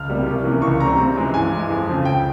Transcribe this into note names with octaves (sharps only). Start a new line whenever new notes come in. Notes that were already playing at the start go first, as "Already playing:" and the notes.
Already playing: C#2 F6
C3 G3 A#3
C2
C3 E3 A#3 C#4
C#2 C#6
C#3 G3 C4 A#5
C3
E3 G#3 C#4
G2 G#5
E3 G#3
F2
C#3 F3 C4
C#2 G5